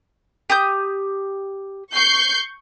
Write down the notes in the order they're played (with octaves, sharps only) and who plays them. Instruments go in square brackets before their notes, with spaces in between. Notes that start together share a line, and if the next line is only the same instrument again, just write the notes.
[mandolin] G4 D#6 G6
[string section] C#6 G6 C7